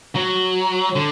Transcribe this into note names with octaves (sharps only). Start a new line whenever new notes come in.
F#3
D3